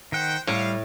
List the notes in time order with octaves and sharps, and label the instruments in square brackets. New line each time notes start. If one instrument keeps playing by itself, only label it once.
[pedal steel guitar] D#3 F#5 [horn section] C5 G5
[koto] A2 [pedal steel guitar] G3 [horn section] F5